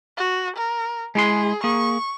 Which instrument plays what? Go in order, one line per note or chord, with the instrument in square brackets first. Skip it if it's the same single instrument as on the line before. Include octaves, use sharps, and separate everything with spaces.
[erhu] F#4
A#4
[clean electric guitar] G#3 E4 C6 [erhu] G#4
[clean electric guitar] A#3 G#4 [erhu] C#6